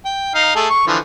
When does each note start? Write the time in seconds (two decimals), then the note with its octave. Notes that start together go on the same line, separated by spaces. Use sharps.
0.05 G5
0.35 D#4 F5
0.55 A3 G#4 A4
0.70 C#6
0.87 D3 E3 F3